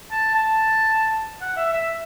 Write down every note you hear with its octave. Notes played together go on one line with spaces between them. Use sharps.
A5
A5
F#5
E5
E5